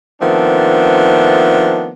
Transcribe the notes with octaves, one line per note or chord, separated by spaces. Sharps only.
D#3 F3 A3 B3 C4 D4